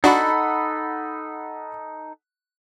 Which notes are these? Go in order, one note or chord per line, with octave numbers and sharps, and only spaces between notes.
D4 D#4 F#4 A4 F#5 B5